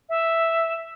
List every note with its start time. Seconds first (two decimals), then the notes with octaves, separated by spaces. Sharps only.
0.09 E5